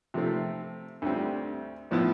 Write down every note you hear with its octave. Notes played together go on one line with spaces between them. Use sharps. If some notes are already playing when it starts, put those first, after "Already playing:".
C3 F3 A3 C4
D2 D3 G3 C4
A2 F3 B3 E4